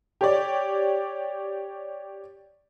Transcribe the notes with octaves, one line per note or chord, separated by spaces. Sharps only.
G4 C#5 D5